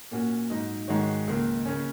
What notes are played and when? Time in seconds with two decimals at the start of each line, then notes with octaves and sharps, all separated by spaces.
0.11 A#2 A#3 C#4 F#4
0.50 G#2 F#3 D#4
0.88 G#2 D#3 G#3 F#4 C#5
1.28 C#2 C#3 A#3
1.66 C#3 A#3 C#4